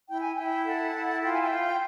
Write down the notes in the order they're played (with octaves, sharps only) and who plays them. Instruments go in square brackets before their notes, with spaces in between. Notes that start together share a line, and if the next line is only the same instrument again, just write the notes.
[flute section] E4 G5
G#5
E4 G5
A4 F#5
E4
F4 G5
G#5
G5
F4